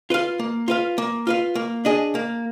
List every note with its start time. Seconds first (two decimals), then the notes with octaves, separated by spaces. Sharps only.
0.10 F4 B4 F5
0.39 A#3
0.68 F4 B4 F5
0.98 A#3
1.27 F4 B4 F5
1.55 A#3
1.85 D4 G#4 D#5
2.15 A#3